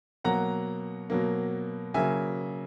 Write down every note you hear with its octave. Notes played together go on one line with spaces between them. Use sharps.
B2 F#3 A#3 F#5 A#5
B2 F#3 A#3
C#3 F#3 A#3 E5 G#5